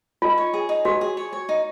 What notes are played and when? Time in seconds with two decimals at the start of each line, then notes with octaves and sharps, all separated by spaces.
0.22 D#4 F4
0.38 C#5
0.54 G#4
0.69 D#4
0.85 F#4 C#5
1.01 G#4
1.17 C#5
1.33 C#5
1.49 D#4